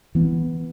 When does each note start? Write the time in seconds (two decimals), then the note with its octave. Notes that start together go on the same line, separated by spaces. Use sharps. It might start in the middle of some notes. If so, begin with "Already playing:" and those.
0.15 E3 B3